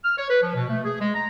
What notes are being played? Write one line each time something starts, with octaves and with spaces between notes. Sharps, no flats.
F6
C#5
B4
F3
B2
A3
G#4
G#3
A#5